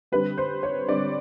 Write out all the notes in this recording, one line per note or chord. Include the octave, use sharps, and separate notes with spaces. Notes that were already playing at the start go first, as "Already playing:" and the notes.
D3 G3 C4 B4
C5
C#5
D3 G3 C4 D5